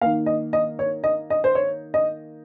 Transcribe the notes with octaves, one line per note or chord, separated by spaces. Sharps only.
D#3 A#3 F5
D#5
D#5
C#5
D#5
D#5
C5
C#5
D#5